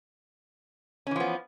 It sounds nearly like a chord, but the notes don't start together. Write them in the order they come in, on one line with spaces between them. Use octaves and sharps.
C#4 E3 F3 B3